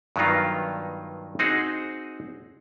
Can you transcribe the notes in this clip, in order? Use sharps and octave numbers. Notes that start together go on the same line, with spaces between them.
G2 D#3 F#3 B3 D#4 F4
C4 D#4 F#4 G#4 C5